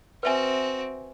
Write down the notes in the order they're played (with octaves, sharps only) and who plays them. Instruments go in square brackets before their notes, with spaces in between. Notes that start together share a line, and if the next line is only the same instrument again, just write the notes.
[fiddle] C4 F#4 [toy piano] B4 E5 G#5